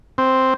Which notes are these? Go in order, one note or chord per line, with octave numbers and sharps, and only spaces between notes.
C4